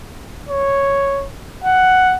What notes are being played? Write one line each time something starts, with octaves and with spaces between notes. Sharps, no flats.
C#5
F#5